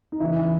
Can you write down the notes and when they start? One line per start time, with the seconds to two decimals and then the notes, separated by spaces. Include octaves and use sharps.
0.12 D#4
0.20 E2 C#3 E3 E4